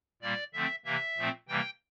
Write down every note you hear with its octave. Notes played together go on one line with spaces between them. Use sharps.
A#2 G3 A#3 D5
D3 F3 A3 C4 E5
C3 E3 A#3 E5
A#2 F3 A3 C4
C3 E3 G3 A#3 G5